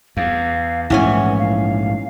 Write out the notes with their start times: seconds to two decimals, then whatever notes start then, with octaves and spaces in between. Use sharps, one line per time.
0.17 E2 F5
0.90 A#1 G#2 E3 A3 C#4 F#5 G#5
1.39 F5